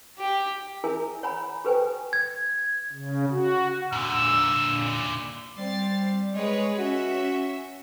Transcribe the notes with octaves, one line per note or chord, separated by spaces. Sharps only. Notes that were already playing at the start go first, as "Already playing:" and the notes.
G4
E4 G#4 A#4 E5 G#5
C#5 F#5 G#5 A#5 B5
G4 A4 B4 C5 G5 G#5
G#6
C#3
F#4
A#2 D3 E6
G3 C4 A6 C7
G#3 G#4 B4 C#5
C#4 F#4 E5